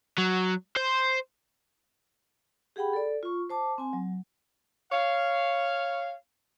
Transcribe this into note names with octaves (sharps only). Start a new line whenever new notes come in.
F#3
C5
G4 G#4 F#5 G5 B5
A4 D5
F4 C#6
C5 A5 D6
C4 G#5
F#3
C#5 F5